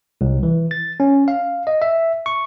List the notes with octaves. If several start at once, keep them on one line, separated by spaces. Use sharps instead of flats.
C2
E3
A6
C#4
F5
D#5
E5
C#6